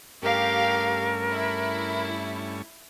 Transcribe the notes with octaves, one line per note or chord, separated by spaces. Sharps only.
G2 A3 C#4 G4 A#4 F5
E4